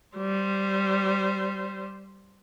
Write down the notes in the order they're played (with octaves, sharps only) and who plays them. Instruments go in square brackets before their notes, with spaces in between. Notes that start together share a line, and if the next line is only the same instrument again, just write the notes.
[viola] G3 C5